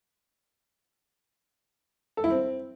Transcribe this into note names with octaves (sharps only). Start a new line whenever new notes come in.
A4
E4
C4